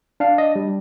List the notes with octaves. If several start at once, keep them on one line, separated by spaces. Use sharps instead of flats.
D4 F5
D#5
G3